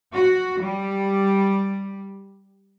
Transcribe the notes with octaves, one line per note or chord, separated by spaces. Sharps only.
F#4
G3